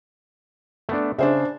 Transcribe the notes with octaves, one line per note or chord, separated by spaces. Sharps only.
A3 B3 D4
C#3 D4 C5 E5